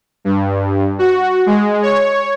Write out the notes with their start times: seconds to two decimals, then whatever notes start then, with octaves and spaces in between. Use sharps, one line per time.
0.25 G2
0.99 F#4
1.46 G#3
1.82 C#5